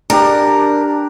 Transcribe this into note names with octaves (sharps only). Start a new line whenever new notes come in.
D4 G4 A#4